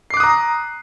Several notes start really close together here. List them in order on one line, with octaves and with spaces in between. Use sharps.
C7 D6 F#6 D#6 A#5